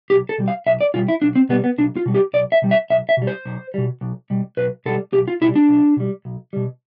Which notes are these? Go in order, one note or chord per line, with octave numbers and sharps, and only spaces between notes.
B1 G4
A4
B2 G3
F5
B1 E5
D5
B2 G3 F4
E4
B1 D4
C4
B2 G3 B3
B3
B1 D4
F4
B2 G3
G4
B1 D5
E5
B2 G3
E5
B1 E5
E5
B2 G3
C5
B1
B2 G3
B1
B2 G3
B1 B4
B2 G3 A4
B1 G4
F4
B2 G3 E4
D4
B1
B2 G3
B1
B2 G3